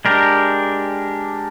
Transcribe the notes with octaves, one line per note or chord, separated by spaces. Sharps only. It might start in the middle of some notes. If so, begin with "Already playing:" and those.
G#3 D4 G4 A#4